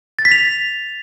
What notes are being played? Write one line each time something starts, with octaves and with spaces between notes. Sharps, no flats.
A6
B6
F7